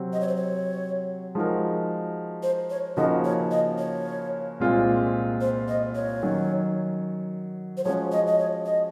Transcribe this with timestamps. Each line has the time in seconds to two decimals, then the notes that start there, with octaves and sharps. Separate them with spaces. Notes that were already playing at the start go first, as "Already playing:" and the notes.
Already playing: C3 F#3 C4
0.13 D#5
0.21 C#5
0.28 C5
0.36 C#5
1.35 F3 G#3 D#4 F#4 A#4
2.43 C5
2.70 C#5
2.97 C#3 F3 A#3 D#4 F#4 D#5
3.24 C#5
3.51 D#5
3.78 C#5
4.60 C2 A#2 G#3 C4 F4
5.41 C5
5.68 D#5
5.95 C#5
6.23 D#3 F#3 C#4
7.77 C5
7.84 F3 G#3 C#4 F#4 C#5
8.12 D#5
8.27 D#5
8.39 C#5
8.66 D#5